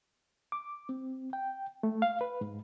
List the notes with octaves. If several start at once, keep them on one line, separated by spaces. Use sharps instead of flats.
D6
C4
G5
A3
F5
B4
G#2